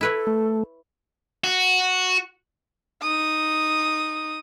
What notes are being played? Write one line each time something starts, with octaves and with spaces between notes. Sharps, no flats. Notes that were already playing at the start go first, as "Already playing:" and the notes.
E4 A4 B4 C#5
A3
F#4
D#4 D#6